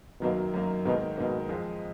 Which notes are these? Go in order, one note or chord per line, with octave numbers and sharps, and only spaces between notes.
F#2 B2 D#3 F#3 A#3
F#2 D#3 F#3 A#3
G#2 B2 D#3 A#3
G#2 B2 D#3 A#3
F2 F3 G#3